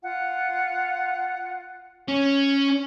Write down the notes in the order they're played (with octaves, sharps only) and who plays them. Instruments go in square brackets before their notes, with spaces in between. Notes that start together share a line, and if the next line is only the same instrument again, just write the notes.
[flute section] F4 F#5
[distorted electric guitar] C#4 [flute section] C#5